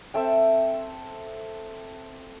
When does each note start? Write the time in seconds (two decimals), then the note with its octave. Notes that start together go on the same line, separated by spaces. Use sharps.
0.14 C4 A4 E5 G5